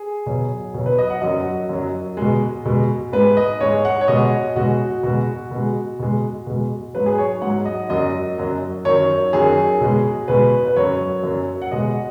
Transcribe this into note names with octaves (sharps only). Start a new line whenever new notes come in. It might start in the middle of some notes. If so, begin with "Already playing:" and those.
Already playing: G#4
B2 F#3
B2 F#3
B4
D#5
F#5
F#2 F#3 D#5
F#2 F#3
B2 G#3
B2 G#3
G#2 G#3 B4
D#5
G#2 G#3 C#5
F#5
C#5
B2 G#3 D#5
B2 G#3 F#4
B2 G#3 F#4
B2 G#3
B2 G#3
B2 G#3
G#2 F#3 B4
G#4
C#5
G#2 F#3 F#5
D#5
F#2 F#3 D#5
F#2 F#3
F#2 D#3 F#3 C#5
F#2 D#3 F#3 G#4
B2 G#3
B2 G#3 B4
B4
F#2 F#3 C#5
F#2 F#3
F#5
B2 G#3 D#5